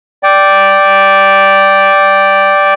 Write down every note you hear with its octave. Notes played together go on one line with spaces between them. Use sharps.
D5 G5